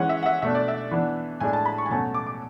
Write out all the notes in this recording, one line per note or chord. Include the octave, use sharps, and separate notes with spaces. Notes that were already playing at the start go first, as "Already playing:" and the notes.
Already playing: E3 G#3 C#4 F#5
E5
F#5
E5
B2 A3 D4 E5
D5
E5
E3 B3 D4
A2 G#3 D4 G#5
A5
B5
C#6
G#5
B2 F#3 A3 C#4 A5
D6
D6